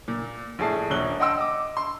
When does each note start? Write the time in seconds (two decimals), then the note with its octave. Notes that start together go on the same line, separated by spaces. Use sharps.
0.08 A#2
0.59 A#1 A2 G#4 A5 C7
0.90 D#1 A#1 C#5 F#6 G7
1.20 D#5 F#5 G5 C6 E6
1.38 D#5 D6
1.77 C6